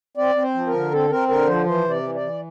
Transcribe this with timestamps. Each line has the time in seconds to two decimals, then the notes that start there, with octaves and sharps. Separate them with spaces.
0.17 C4 D5
0.35 C4
0.42 C5
0.54 F3
0.67 A#4
0.73 D3
0.91 C4 A4
1.10 C4 A#4
1.28 D3 A#4
1.47 F3 C5
1.66 E3 C5
1.84 C3
1.90 D5
2.03 E3
2.15 D5
2.21 E3